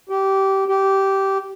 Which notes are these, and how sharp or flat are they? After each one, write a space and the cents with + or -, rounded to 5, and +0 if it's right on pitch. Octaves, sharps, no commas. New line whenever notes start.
G4 -20
G4 -15